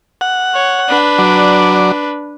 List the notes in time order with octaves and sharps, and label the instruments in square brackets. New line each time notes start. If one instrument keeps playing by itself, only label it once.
[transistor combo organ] F#5
[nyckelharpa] C#5
D4 B4
[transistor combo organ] F#3 D5